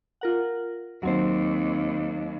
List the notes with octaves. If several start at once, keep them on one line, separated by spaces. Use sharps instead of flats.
F4 A#4 F#5
D#2 F#3 C4 C5